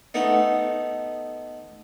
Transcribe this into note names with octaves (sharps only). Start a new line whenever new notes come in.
A3 B3 D#4